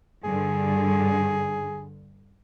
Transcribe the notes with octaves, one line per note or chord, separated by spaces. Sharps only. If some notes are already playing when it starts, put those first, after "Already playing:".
G2 D3 G#4